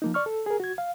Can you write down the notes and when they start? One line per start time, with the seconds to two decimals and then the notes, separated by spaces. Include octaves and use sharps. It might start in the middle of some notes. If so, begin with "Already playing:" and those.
0.02 F3 A#3 D#4
0.14 D5 C#6 F6
0.26 A4
0.46 G#4 A#4
0.60 F#4 G#6
0.78 F5